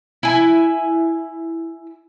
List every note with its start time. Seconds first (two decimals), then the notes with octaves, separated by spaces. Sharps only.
0.23 E4 G#5